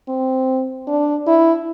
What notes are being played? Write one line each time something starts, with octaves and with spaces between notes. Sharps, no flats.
C4
D4
E4